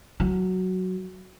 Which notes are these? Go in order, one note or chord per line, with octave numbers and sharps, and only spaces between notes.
F#3